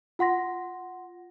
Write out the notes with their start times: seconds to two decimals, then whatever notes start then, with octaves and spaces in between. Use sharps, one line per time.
0.19 F4 F#5 C6 A#6